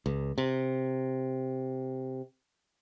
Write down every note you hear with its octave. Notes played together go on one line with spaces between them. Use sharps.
C#2
C3